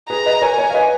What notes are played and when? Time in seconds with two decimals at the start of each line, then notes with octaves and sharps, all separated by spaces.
0.10 G#4 B4 A#5
0.26 B4 D#5
0.42 A#4 C#5 G#5
0.58 A#4 C#5
0.70 F5
0.74 B4 D#5